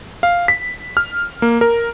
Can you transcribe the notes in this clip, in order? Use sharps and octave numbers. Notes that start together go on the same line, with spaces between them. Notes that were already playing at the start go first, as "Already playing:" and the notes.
F5
B6
F6
A#3
A#4